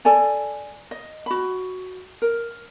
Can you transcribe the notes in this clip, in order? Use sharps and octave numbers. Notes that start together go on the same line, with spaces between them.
A4 D5 G#5 A5
D#5
F#4 B5
A#4